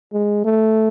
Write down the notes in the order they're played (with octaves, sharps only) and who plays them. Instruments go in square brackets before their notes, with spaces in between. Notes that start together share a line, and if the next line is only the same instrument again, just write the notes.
[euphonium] G#3
A3